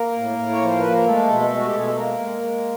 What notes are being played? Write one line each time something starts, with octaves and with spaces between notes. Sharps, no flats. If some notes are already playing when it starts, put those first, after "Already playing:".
Already playing: A#3 A#4
A2
A2
C#5
F3 C5
A#3 B4
A#4
G#3 A3 A4
B2
G#3
F#4
G4
B2 G#4
A4
G#3 A#3 A#4
G#3
G#3